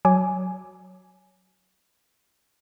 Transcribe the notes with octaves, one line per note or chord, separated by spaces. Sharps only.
F#3 G#5 D6